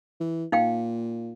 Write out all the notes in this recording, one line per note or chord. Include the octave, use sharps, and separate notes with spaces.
E3
A#2 D#4 F5 G5